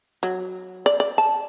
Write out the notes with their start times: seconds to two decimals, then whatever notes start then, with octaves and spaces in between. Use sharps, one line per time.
0.23 F#3
0.86 D5
1.00 D5
1.18 A5